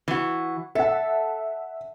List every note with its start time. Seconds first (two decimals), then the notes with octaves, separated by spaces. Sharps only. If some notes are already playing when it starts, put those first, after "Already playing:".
0.08 E3 F#4
0.75 A4 E5 F#5